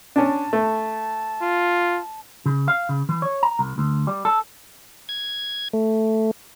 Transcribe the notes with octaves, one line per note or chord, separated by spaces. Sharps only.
C#4 D4 A5
A3
F4
C#3
F5
C#3
E3
C#5
A#5
C2
D2
G3
A4
G#6
A3